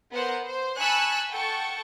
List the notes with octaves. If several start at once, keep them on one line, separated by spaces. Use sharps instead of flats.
B3 A#4 C5 F#5
C5
G#5 A5 B5 C#6 E6 F#6
A4 F#5 G5 A5 C#6